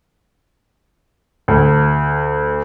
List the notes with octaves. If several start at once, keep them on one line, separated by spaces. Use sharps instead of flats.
D2